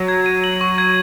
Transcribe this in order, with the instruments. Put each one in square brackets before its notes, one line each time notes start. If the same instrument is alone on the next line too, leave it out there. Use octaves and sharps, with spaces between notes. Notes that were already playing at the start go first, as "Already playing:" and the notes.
Already playing: [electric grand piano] F#3
[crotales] G#6
D#7
F#7
C#6
G#6